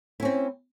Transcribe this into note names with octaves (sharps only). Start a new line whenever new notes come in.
C4 C#4 E4